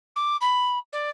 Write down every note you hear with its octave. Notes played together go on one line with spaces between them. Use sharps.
D6
B5
D5